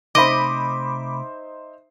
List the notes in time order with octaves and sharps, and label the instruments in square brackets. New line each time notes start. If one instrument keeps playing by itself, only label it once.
[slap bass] C3 A3 [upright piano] D#4 C5 E5 [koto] D#5 [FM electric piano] B5 D6